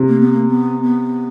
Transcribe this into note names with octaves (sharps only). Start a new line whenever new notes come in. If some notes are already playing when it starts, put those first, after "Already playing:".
Already playing: C3
A#3
B3
A#3
B3
B3